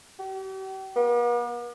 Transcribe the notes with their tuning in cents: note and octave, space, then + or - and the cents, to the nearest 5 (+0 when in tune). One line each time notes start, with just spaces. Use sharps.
G4 -40
B3 -45